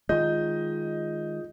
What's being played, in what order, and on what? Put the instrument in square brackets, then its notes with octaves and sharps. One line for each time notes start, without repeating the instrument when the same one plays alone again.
[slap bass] D#3 G#3 [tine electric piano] F4 G#4 G6 [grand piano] D#5